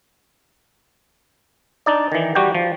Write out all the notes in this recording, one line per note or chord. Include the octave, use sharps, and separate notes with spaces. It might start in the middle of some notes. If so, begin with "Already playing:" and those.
D4 D#4 D5
D#3 E3
G3 F#4 G4 G5
F3